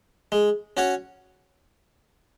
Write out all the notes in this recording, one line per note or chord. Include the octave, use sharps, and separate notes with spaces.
G#3
C#4 F#4 C#5